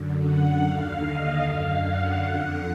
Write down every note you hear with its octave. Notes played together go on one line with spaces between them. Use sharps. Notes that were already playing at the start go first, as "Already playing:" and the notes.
Already playing: F#2 D3
F#5
D#2 D3 F5
D#5
F#2 D3 F5
F#5
F2 D3 F#5